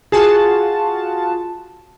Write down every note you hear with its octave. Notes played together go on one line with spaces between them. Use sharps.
F4 F#4 G#4 A5